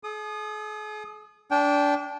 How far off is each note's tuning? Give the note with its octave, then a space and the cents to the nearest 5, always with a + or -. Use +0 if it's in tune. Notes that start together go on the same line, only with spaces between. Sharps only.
G#4 +45 D#6 -20
D4 -25 G5 +0